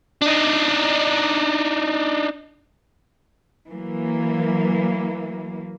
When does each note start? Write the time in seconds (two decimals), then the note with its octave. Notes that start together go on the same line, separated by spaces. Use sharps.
0.22 D4 D#4
3.70 E3 F#3 A#3